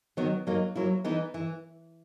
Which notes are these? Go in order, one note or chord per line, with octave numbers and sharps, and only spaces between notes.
D#3 F#3 B3
F#3 A#3 D#4
F#3 A#3 E4
E3 B3 D#4
E3